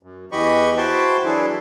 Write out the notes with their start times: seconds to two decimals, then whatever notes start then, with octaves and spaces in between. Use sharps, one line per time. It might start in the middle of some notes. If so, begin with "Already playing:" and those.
0.03 F#2
0.32 E2 E3 G4 D#5 B5 C#6
0.77 E4 F#4 C5 G5 A5 C6
1.25 E3 F#3 D4 E4 G#4 A4